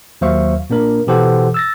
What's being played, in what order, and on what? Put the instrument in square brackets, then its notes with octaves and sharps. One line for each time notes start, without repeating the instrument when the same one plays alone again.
[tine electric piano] D#2 F#3 C5 E5 F5 C#6
A#2 A#3 D4 A#4
B2 E3 G4 A4 C5 F#5
E6 A6 A#6